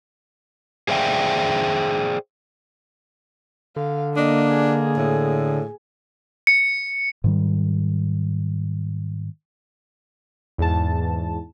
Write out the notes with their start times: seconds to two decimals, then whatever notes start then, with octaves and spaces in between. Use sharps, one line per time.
0.88 G#4 C5 D5 E5 F5 G5
3.76 D3 F5
4.16 A#3 D4 D#5
4.53 G#4
4.96 A2
6.47 C#7
7.24 G#2 D#3 G3
10.58 E2 G#2 A5